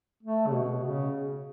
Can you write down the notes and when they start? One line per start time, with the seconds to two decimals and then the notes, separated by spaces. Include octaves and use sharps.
0.23 A3
0.47 C#3
0.53 B2
0.83 C#3